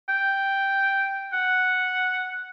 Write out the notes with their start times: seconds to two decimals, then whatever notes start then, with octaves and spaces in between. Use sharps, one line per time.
0.09 G5
1.33 F#5